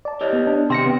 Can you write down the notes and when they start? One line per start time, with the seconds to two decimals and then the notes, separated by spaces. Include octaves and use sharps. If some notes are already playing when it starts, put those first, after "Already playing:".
0.05 D5 A5
0.21 G4 C#5 D#5
0.33 B3
0.47 D4
0.70 D#2 C3 G5 C6 A#6 C#7
0.86 B3